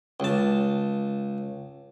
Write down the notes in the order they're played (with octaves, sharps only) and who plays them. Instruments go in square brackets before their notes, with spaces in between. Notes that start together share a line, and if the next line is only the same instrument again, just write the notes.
[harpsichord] C#2 A5